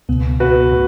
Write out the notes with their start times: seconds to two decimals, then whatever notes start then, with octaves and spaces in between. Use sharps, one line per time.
0.09 C#2 B2 B3
0.39 C#2 B2 B3 F#4 B4
0.72 A2